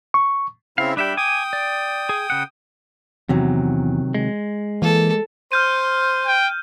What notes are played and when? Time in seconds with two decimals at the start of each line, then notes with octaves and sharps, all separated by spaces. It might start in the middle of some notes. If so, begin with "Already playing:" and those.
0.14 C#6
0.78 C#3 C4 E4 F5
0.97 G3 D4 E5 G5 B5
1.17 G5 G#5 D6 D#6
1.53 D5
2.09 G#4
2.30 C#3 F#5
3.29 E2 C3 D#3 F#3
4.15 G#3
4.82 E3 A#3 A4
5.52 C5 F6 G6 D#7
6.27 G5